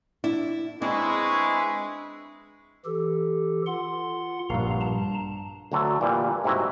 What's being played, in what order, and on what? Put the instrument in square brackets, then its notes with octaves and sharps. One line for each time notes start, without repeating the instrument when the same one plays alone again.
[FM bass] D4 [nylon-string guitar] E4
[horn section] G#3 E4 [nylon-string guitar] C4 [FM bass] D4 [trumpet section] B4 B5 C#6
[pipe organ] E3 G4 A4
F4 F#5 C6
[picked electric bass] A#1 G2 [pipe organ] F5 A#5
[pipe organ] A5 A#5
[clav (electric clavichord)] D2 D3 F#3 A4
A#2 E3 G3
G#2 C3 F#3 E4 F#4